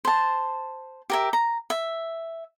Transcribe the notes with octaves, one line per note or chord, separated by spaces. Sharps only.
C5 A5
G4 A#4 E5
A#5
E5